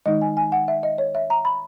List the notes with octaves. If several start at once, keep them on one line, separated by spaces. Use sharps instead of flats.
D#3 G#3 D#4 D#5
G#5
G#5
F#5
E5
D#5
C#5
E5
A#5
B5